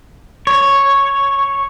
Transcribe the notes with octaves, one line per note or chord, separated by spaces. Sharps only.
C#5